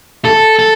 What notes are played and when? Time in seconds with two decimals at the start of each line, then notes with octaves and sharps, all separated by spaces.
0.25 A4
0.59 A4